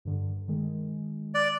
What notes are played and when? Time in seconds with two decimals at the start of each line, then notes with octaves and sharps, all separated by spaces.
0.05 G2 D3
0.48 D#3 G#3
1.35 D5 F#6